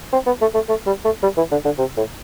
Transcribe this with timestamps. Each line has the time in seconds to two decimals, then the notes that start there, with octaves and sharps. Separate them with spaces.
0.13 C4
0.26 B3
0.41 A3
0.54 A3
0.68 A3
0.86 G3
1.04 A3
1.23 G3
1.37 E3
1.51 D3
1.65 D3
1.78 C3
1.97 A2